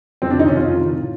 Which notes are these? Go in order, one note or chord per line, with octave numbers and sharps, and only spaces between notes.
F2 C4
D4
C3 D#3 D#4
C#4
F2 F4
C3 D#3
A2